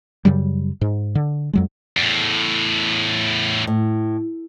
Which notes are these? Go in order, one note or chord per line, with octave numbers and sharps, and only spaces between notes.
F#2 C#3 F#3 G3
G#2
D3
F2 F#3 G#3
E2 A2
A2